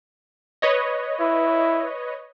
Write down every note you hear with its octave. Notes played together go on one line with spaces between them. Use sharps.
B4 C#5 D#5
E4